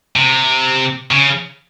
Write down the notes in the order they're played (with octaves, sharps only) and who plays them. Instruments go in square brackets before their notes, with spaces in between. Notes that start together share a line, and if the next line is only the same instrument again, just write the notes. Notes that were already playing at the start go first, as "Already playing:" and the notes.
[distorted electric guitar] C3
C#3